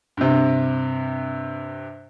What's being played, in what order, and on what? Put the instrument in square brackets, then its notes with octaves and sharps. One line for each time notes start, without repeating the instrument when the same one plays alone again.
[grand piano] G2 C3